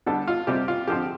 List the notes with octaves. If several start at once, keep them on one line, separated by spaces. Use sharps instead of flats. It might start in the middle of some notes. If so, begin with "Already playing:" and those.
D3 G3 B3 A4
F4
C3 G3 C4 G4
F4
D3 F3 C4 G4